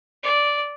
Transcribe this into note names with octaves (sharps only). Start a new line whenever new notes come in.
D5